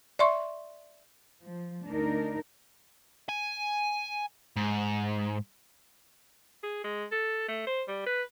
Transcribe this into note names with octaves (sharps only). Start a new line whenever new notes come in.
D5 E5 C6 C#6
F3
D2 D4 D#4 A#4
G#5
G#2
G#4
G#3
A4
A3
C5
G3
B4